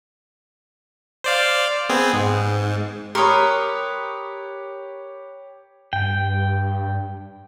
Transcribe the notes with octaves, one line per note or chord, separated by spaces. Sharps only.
C5 D5 F5
B3 C4 G#4
G#2
G4 A#4 B4 C#5 C6 C#6 D#6
G2 G5